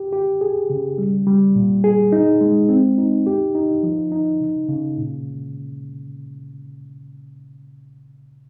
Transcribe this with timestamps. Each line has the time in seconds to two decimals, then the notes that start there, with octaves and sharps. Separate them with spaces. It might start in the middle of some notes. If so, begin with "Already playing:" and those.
Already playing: G4
0.13 G4
0.41 G#4
0.70 C#3
0.98 G3
1.27 G3
1.55 A#2
1.84 G#4
2.12 D#4
2.41 G#3
2.69 C4
2.98 D#4
3.27 G4
3.55 D#4
3.83 F3
4.12 D#4
4.40 C#3
4.69 C#3
4.98 A#2